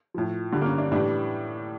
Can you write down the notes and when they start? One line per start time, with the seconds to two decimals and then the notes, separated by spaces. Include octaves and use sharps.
0.14 A2 F3
0.52 G2 D3 G3
0.62 A#3
0.66 C#4
0.78 D4
0.92 A2 E3 G3 D4